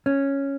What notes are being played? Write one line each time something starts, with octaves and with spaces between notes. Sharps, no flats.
C#4